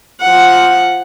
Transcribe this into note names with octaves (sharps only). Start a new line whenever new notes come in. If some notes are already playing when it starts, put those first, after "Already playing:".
F3 F#5